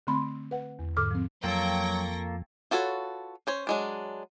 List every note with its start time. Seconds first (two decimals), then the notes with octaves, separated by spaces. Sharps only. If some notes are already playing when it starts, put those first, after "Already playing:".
0.07 D3 A3 C4 B5 C6
0.51 B4 F#5
0.79 E2
0.97 G#2 D3 A4 D6 F6
1.11 F3 C4
1.44 F2 F#3 A#3 F4 A4 G5 C#6 A#6
2.71 F4 F#4 A4 B4 C#5
3.47 C#4 C5 C#5
3.67 F#3 G#3 D4